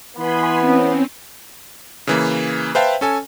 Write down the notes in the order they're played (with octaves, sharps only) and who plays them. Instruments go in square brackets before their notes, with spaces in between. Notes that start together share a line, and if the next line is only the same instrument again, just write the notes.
[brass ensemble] E3 B3 [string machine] G#5 B5 C6
[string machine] C4 C#4
[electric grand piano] C#3 E3 A#3
B4 C5 E5 F5 G5 A5
C#4 A4 G#5